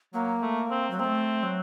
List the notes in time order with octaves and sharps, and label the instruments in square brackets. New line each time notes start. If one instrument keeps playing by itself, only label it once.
[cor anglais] F#3 [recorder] A#3
[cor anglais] A3
C4
[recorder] F#3
[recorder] A#3 [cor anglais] C4
[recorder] A3
F#3